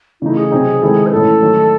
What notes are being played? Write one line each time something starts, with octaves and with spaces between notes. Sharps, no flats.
C#3 E3 A3 D#4 E4
G#4
C3 F#3 C4 D#4
D#3 G#3 C4 E4 A4
C5
A2 E3 A3 C#4 A4
D#3 F#3 A3